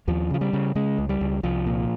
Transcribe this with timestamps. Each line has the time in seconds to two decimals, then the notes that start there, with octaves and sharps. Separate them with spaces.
0.08 D#2 F3
0.30 C#3 F3
0.41 G3
0.53 C#3
0.75 C#3 G#3
0.98 C#2
1.09 G3
1.21 C#2
1.43 C2 F3
1.66 A#2